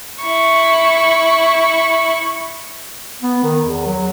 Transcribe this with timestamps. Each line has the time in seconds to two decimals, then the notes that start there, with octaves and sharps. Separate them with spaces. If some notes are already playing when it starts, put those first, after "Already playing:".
0.21 E4 C#6
3.23 B3
3.44 D#3
3.65 E2
3.87 F#3